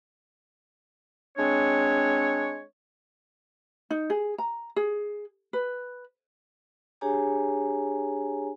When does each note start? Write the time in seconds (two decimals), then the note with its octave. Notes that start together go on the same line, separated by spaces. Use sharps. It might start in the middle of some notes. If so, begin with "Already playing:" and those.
1.37 G#3 C4 D4 C#5
3.90 D#4
4.10 G#4
4.38 A#5
4.76 G#4
5.53 B4
7.01 D4 G4 G#4 C#5 G#5 A#5